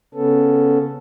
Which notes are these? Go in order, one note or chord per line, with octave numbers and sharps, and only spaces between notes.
C#3 B3 C#4 A4